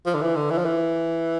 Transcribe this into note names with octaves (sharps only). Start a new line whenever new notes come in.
F3
D3
E3
D3
E3
F3
E3